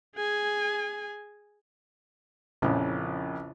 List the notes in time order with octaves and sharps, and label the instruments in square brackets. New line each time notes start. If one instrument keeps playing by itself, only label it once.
[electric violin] G#4 G#5
[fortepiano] A#1 F2 [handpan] C#3 C#4 E4